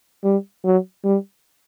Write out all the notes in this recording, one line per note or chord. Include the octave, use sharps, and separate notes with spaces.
G3
F#3
G3